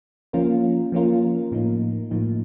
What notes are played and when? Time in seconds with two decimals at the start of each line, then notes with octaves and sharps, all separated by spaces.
0.33 F3 A#3 C#4 F4 A#4
0.92 F3 A#3 C#4 F4 A#4
1.52 A2 F3 A#3 D#4
2.11 A2 F3 A#3 D#4